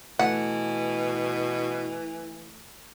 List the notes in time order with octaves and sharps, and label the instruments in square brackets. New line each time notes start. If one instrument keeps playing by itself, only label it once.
[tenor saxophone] B2 [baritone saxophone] E3 [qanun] A3 [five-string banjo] F#5